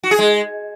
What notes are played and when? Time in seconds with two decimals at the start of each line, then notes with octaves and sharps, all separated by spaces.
0.04 F#4
0.11 G#4
0.19 G#3